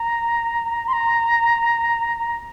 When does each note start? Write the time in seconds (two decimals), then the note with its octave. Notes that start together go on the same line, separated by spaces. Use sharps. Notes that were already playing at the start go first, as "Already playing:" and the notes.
Already playing: A#5
0.88 C6
0.93 A#5